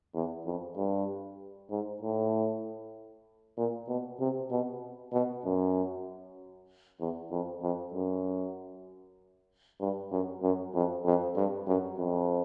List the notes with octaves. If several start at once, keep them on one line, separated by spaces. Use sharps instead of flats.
E2
F2
G2
G#2
A2
A#2
B2
C3
B2
B2
F#2
E2
F2
F2
F#2
G2
F#2
F#2
F2
F2
G2
F#2
F2